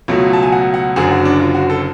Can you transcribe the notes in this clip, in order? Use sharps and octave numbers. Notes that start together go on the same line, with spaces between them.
C#2 B2 F#3 A3
A5
G#5
F#5
F#5
F#1 F#2 D3 G#4
F#4
D4
F4
F#4
A4